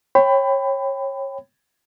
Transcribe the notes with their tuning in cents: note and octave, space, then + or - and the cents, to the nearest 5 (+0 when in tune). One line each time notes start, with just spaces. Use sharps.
C#5 -25 G5 +5 B5 +25